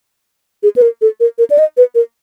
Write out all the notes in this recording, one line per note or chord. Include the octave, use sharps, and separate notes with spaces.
G#4
B4
A#4
A4
A#4
A#4
D5
D#5
B4
A#4